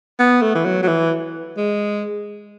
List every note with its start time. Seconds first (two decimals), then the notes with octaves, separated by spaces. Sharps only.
0.19 B3
0.42 A3
0.55 E3
0.65 F#3
0.83 F#3
0.88 E3
1.57 G#3